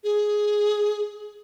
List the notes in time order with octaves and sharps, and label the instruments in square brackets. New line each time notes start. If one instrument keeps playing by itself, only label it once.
[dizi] G#4